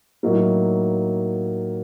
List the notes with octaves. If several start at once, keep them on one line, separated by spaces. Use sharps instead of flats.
A2 F#3 A#3 D#4